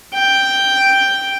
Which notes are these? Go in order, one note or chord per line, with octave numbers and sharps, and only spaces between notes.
G5